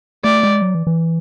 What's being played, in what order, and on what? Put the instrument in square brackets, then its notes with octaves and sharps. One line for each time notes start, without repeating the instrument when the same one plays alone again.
[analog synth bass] A3 [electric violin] D5
[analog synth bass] G#3
F#3
E3
E3